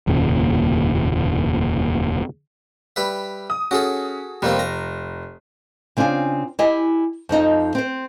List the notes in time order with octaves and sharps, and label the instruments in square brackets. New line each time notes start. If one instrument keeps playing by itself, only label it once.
[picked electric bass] F1 D#2 A#2 C#3
[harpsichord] G3 B4 E5
[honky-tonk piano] D#6
[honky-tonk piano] C#4 [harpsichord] F#4 G#4 A4
[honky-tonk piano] F1 [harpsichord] G3 A#3 C4
[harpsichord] A#5
[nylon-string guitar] C#3 C4 D4 F4 G#5
E4 G4 D#5 G#5
F2 F3 D#4 D#5
C4 C5